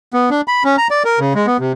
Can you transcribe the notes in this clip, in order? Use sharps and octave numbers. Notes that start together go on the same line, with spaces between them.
B3
D4
B5
C#4
A#5
D5
A#4
C#3
G#3
B3
C3